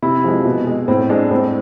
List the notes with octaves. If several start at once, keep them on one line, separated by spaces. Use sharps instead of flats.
C3 E4
F3 G#3
B2
G#3
A2 C4
G#3 D4
A2 C4